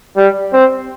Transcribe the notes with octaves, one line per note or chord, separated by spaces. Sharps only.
G3
C4